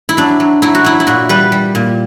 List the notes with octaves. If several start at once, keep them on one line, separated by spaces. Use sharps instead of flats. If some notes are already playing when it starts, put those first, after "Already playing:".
E4
F#3 D4
F#3
F#3 E4
F#4
F#3 E4
E4
A#2 F#4
G3 B4
G3
A#2